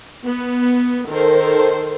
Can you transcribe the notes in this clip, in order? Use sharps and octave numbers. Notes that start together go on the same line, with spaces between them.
B3
D#3 A4 A#4 C5